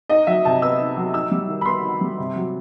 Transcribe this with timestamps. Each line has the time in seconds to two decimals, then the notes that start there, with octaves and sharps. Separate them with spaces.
0.09 D#4 D#5
0.27 F#3 E5
0.45 C3 A5
0.62 B3 E6
0.80 D#4
0.97 F#3
1.14 D#4 E6
1.31 G3
1.48 D#3
1.61 B5
1.65 B3 C6
1.83 D#4
2.01 G3
2.18 C3
2.36 F#3